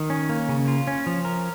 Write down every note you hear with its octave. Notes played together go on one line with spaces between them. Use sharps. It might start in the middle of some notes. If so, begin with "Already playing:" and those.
Already playing: D#3
C#4
A#3
C#3
F4
C#4
F3
A#4